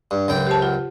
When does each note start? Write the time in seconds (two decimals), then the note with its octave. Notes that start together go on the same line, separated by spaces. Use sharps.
0.11 G2
0.28 C#2 F#2 G5
0.47 G4 C5 A5
0.62 F4 F#5